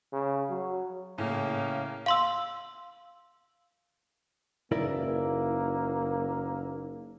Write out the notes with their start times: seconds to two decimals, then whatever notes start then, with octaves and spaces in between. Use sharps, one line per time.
0.13 C#3
0.49 F#3
1.18 A2 C#3 A#3
2.06 F5 C6 E6
4.72 F#1 A#3 D#4 E4 A#4 B4 D5 E6